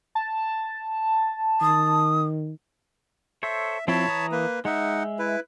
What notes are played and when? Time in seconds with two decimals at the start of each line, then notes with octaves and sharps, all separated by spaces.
0.15 A5
1.61 D#3 D#6
3.43 A4 C5 C#5 E5
3.88 F3 C4 E4 C#5 A5 B5
4.08 E3 A#5 D#6
4.32 A#3 B4
4.65 G#3 D#4 E5 F#5
5.19 E4 B4